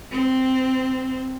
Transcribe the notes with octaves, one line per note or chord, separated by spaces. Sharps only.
C4